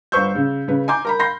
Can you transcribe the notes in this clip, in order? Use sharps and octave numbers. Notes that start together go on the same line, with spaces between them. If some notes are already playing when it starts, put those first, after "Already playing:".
G1 B4 C5 C#6 E6 G6
C#3
C#3 B4
G#5 A#5 C6 D6 G6
A#4 A#5 B5
B5 C6 G6 A#6 C7